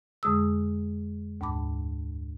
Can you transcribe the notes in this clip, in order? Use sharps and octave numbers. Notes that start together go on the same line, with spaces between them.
F2 D3 G#3 G#4 D#6 E6
D2 G#2 A5 B5 D6